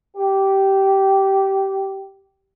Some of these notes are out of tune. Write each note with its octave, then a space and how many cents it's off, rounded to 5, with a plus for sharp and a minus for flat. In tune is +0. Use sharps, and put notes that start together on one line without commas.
G4 -15